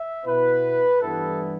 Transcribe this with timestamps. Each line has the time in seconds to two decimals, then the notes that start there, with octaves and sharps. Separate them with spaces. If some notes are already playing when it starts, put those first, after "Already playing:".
Already playing: E5
0.26 B2 B3 E4 B4
1.01 G2 E3 G3 B3 E4 A4